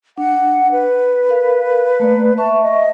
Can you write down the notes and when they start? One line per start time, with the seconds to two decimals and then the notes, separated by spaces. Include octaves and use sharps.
0.18 D4 F#5
0.72 B4
1.29 A#4 F5
2.00 A3 A#3 D5
2.38 E5 A5 C#6
2.63 D#5